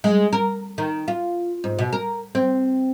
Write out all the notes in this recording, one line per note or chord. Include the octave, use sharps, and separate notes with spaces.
G#3
A#4
D#3
F4
G#2
B2
A#4
C4